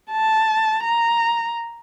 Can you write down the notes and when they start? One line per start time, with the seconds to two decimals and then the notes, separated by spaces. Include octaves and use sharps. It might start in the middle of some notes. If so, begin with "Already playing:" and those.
0.11 A5
0.84 A#5